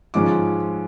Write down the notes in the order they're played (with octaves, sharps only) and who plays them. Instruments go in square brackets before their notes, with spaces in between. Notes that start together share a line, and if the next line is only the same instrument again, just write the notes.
[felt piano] G#2 F3 G#3 C#4 D6